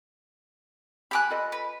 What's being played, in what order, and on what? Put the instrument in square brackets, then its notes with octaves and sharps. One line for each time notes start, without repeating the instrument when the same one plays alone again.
[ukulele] G4 G#5 [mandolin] B5 D6 F#6
[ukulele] F4 A4 D#5
[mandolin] B4